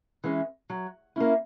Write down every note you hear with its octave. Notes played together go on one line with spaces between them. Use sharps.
E3 G#3 C#4
F#3
A#3 C#4 E4